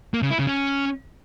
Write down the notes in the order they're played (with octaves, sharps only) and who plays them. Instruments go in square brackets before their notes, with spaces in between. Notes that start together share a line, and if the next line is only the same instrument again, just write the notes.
[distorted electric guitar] A#3
C#3
E4
C#3
C#4